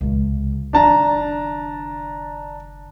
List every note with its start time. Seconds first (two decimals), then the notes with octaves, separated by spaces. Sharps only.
0.01 C#2 C3
0.73 F#1 D#3 D4 A5 A#5